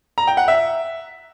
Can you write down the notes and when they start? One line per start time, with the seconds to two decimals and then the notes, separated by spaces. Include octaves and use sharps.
0.18 A#5
0.27 G5
0.37 F#5
0.48 E5